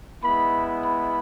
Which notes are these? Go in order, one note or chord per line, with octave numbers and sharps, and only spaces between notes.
G#3 B3 E4 B5
B5